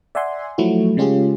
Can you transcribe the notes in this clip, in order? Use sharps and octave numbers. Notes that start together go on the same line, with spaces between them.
D5 E5 F#5 G#5 C6
F3 F#3 A3 E4 F#4
C#3 G#3 C#4 F4 G4 G#4